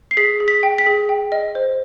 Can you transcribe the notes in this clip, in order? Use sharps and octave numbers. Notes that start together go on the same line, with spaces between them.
C7
G#4 B6
G#4
B6
G5
B6
G#4
G5
D#5
C5